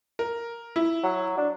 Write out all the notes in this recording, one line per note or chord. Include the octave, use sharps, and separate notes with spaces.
A#4
E4
F#3
D4